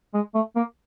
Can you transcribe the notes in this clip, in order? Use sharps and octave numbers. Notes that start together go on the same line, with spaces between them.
G#3
A3
A#3